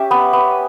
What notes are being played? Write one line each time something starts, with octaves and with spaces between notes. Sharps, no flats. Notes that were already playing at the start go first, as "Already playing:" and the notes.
Already playing: C#4 G4 E5
B3
B3